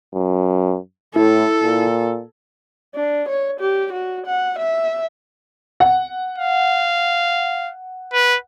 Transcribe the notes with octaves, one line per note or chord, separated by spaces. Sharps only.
F#2
A2 E4 A4
A#2
D4
C#5
G4
F#4
F#5
E5
F#5
F5
B4